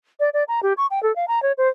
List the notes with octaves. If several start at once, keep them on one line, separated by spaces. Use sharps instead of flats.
D5
D5
A#5
G4
C#6
G5
A4
F5
A#5
C#5
C5